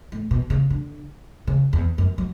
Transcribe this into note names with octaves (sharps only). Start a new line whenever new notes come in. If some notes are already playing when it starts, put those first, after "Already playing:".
A2
B2
C#3
D3
C#3
E2
F#2
F#3